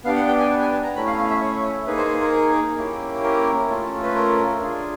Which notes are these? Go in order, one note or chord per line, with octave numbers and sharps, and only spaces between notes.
B3 D4 G4 F5
F#5
G5
G#5
A5
G#5
A5
A#5
A3 C#4 E4 B5
F5
F5
E5
C#5
A#3 D#4 G#4 B4
C5
C5
A#4
A#3 C#4 E4 G4
A#4
A3 C#4 F4 A4
B4
A#4
D4 F4 G#4